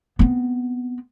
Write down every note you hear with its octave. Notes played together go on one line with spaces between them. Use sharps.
B3 C4